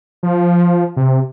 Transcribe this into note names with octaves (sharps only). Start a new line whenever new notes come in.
F3
C3